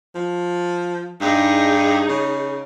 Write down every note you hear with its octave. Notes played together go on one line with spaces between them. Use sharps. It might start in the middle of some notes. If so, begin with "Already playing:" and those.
F3
G2 D#4 G#4
C#3